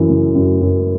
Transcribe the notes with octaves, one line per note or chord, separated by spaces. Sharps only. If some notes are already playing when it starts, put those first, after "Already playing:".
Already playing: F#2 E3
C#3
F#2
F#2